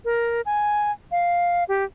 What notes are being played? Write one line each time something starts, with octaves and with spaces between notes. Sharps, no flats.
A#4
G#5
F5
G4